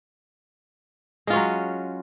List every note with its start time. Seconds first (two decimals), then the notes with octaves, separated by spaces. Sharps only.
1.27 G#3
1.30 F4
1.33 C#4
1.36 F#3